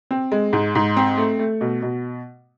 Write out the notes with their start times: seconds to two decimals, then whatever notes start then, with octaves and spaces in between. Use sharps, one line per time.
0.11 C4
0.32 G#3
0.53 G#2
0.75 G#2
0.97 C4
1.18 A3
1.39 A3
1.61 B2
1.82 B2